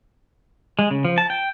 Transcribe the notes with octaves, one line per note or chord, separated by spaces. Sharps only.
G#3
C#3
F3
A5
G5